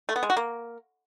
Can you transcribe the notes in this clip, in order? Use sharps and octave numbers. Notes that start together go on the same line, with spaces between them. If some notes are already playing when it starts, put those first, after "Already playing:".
A3
B3
G#3
F#4
A#3